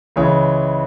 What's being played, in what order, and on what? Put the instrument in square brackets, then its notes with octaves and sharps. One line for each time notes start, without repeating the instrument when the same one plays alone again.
[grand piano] C#2 C#3 E3 C#5